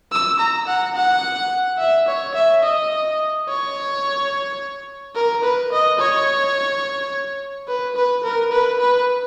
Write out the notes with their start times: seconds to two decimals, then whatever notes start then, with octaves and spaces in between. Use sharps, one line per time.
0.12 E6
0.40 A#5
0.68 F#5
0.96 F#5
1.79 E5
2.08 C#5
2.35 E5
2.63 D#5
3.48 C#5
5.16 A#4
5.44 B4
5.72 D#5
6.00 C#5
7.68 B4
7.96 B4
8.24 A#4
8.52 B4
8.80 B4